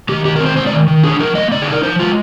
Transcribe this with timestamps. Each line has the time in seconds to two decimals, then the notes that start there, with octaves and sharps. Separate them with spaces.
0.09 D#3 G4
0.25 D#3 G4
0.36 A#4
0.40 C4
0.46 C5
0.57 G#3 C5
0.67 D5
0.72 D#3
0.88 D#3
1.04 D4 G#4
1.19 F3 A#4
1.35 A#3 D#5
1.51 D3 D5
1.62 G#4
1.67 D#4 A#4
1.83 F3 C5
1.99 G#3 F4